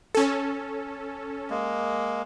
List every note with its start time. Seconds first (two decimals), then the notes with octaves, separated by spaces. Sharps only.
0.15 C#4 A4
1.50 G#3 A#3